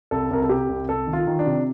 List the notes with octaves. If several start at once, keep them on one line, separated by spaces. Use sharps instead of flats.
C2 A4
C2 A#4
A4
C3 G4
C2
C2 A4
D#3
F4
D#3
D4
C3